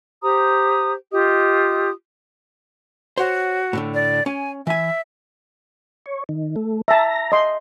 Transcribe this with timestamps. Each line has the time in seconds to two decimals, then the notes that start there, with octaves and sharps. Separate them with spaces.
0.23 G4 C5 A#5 D#6
1.12 F4 G4 D#5 D#6
3.18 F#4 C5 C#5 F#5
3.73 A2 D3 A3
3.94 D5
4.26 C#4 G#5
4.67 E3 E5 G#5
6.06 C#5
6.29 D#3
6.56 A3
6.88 E5 A5 A#5
7.32 D#5 C6